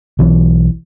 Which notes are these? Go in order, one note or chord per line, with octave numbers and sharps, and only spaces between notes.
B1 E3